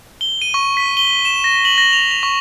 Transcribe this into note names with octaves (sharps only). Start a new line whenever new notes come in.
G7
D#7
C#6
B6
G7
E7
A#6
F#7
A#6
F7
F7
C#6